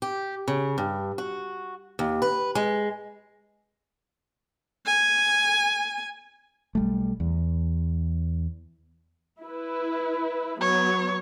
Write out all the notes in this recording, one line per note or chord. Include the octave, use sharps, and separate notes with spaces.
G4
C#3
G2
F#4
D#2
B4
G#3
G#5
B1 G3 A3
E2
E4 B4
F#3 B3 C#5